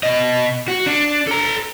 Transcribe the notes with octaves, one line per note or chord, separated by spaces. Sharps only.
B2 D#5
F#4
D4
A4 A#5